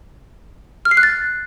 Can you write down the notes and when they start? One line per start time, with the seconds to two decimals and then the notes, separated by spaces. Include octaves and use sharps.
0.85 F6
0.91 C7
0.97 F#6
1.03 A6